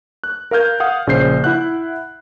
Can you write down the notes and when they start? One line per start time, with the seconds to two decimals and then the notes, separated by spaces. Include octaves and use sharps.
0.24 F#6
0.51 A#4 F5 F6 G6 G#6
0.80 F5 F#5 D#6
1.07 A#1 C#3 C5 G6 C7
1.44 E4 E5 F#5 F#6